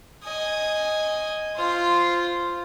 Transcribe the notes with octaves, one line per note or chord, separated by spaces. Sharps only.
D#5 G#5
F4 C5